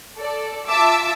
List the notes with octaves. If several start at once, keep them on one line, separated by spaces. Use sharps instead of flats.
A4 D5
F4 E5 A5 D6 E6